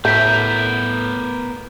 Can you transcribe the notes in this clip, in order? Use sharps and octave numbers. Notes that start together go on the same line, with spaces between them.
A2 A3 B3 A#4 G6 B6